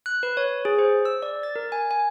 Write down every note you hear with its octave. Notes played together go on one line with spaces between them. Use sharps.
F#6
B4
C#5
G#4
C5
E6
D5
A6
A#4
G#5
G#5